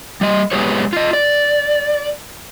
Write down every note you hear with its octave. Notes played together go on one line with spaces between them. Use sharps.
G3 D#5
G#3 B3 G4 G#4 B4 C#5
F4 D#5
D5